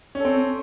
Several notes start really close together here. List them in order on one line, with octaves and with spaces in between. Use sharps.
C#4 A4 C4